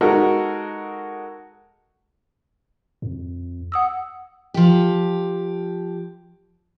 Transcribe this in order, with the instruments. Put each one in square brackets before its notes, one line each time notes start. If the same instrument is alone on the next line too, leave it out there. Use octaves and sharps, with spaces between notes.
[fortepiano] G#3 D#4 F#4 A4 A#4
[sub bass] F2
[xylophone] F#5 D#6 E6
[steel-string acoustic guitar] F3 G4